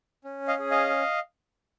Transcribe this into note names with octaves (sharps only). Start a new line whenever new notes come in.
C#4
D#5 F5
G#4
D#5 F5